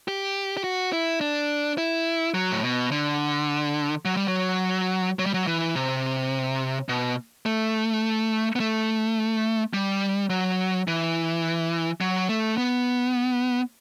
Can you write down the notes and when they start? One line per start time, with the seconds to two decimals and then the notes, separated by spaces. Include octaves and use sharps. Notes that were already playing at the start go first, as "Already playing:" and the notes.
0.08 G4
0.57 G4
0.64 F#4
0.93 E4
1.21 D4
1.78 E4
2.34 F#3
2.52 A2
2.63 B2
2.92 D3
4.05 F#3
4.17 G3
4.28 F#3
5.19 F#3
5.26 G3
5.34 F#3
5.47 E3
5.76 C3
6.89 B2
7.46 A3
8.56 B3
8.60 A3
9.74 G3
10.30 F#3
10.88 E3
12.01 F#3
12.29 A3
12.57 B3